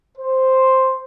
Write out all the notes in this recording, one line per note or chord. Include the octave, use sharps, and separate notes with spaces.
C5